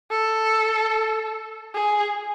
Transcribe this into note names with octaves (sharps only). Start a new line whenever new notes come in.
A4
G#4